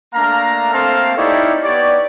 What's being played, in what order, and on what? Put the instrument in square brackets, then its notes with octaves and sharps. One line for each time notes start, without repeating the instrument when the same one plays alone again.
[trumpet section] A3 A#3 D4 F5 A#5
A3 A#3 C4 A4 C5 F5
D#4 E4 G4 C#5 D5
B3 G4 C#5 D5